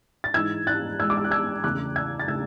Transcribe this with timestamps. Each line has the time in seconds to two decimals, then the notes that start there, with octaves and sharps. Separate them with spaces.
0.24 A6
0.34 G#2 E3 G#3 E6 G#6
0.67 F#6 A6
0.99 G#2 E3 G#3 E6 G#6
1.10 D6
1.17 E6
1.24 F#6
1.31 E6 G#6
1.63 E2 C#3 E3 A3 D6 F#6
1.96 E6 G#6
2.20 A6
2.28 C#3 E3 A3 E6 G#6